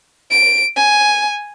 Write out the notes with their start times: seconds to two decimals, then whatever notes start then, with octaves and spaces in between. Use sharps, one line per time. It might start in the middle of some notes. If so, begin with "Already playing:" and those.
0.31 D7
0.76 G#5